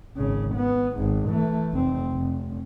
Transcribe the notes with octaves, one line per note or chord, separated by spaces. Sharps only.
G#1 C#3
B3
G#1 G#2
E3 A3
F1 C4
F1